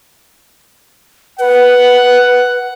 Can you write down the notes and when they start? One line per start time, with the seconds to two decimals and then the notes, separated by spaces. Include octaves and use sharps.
1.39 B4 F#5